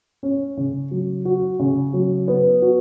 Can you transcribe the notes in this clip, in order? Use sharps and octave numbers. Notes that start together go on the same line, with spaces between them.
C#4
C#3
F#3
F#4
C#3
F#3
B3
F#4